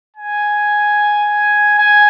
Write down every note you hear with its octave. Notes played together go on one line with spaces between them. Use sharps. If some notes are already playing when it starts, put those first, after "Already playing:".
G#5
G#5